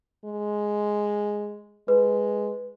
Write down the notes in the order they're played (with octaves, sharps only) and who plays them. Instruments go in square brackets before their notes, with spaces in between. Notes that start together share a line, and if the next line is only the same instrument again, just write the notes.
[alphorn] G#3
[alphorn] G#3 [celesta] B4